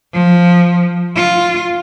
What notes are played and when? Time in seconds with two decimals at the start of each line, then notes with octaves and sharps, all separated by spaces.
0.14 F3
1.16 F4